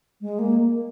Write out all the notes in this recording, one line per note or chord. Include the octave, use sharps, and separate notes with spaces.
G#3
A#3